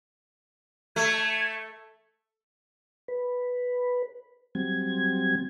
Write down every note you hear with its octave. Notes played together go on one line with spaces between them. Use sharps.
A3 G#6
B4
F#3 G3 C4 G#6